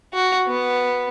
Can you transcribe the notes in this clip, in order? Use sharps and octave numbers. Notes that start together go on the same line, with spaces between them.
F#4
B3